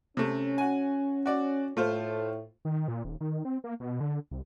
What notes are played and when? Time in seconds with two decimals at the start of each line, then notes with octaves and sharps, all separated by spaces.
0.17 C3 A3 C#4
0.58 F#4 G#5
1.26 F#4 D5
1.77 A2 A3 F4 C5
2.65 D#3
2.88 A#2
3.05 D#1
3.21 D#3
3.45 C4
3.64 A#3
3.80 B2
4.00 D3
4.31 C2